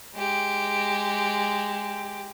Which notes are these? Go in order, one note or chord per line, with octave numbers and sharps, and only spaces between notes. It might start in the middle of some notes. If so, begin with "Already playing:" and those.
G#3 G4